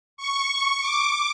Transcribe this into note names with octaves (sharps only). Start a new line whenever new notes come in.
C#6
D6